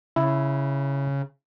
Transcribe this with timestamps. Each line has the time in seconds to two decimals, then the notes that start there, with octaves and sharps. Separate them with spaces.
0.16 C#3 E4